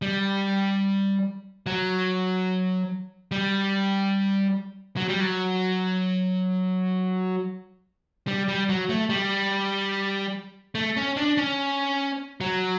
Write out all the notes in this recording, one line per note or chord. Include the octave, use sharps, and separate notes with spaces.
G3
F#3
G3
F#3
G3
F#3
G3
G3
F#3
A3
G3
A3
C#4
D4
C#4
F#3